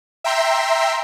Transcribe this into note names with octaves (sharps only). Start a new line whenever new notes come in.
E5 G5 A#5 C6